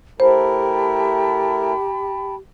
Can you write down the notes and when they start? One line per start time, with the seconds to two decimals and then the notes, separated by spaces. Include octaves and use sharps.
0.20 A3 E4 G4 A#4 C5 G5 A5 B5